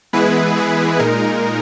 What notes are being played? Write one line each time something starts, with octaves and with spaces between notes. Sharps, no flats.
E3 G#3 B3 E4 G#4 B4
G#4
A#2 G#3 D#4 A#4